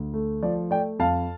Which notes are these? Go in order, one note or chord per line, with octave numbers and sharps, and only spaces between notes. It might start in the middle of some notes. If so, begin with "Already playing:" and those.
Already playing: D2
A3
F3 D5
A3 D5 G5
F2 F5 A5